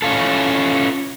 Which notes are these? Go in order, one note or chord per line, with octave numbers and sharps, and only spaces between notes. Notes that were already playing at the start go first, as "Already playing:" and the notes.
C#4 E4 F4 A4